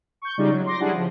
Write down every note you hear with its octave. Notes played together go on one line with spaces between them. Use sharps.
C#6 G6
C#3 G3 D#4 F4 D5
F#3
C6 D6 A#6
G3 D4 E4 G#4 F#5
C#3 F3